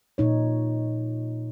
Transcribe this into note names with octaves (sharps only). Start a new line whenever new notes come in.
A#2 D#4 C#5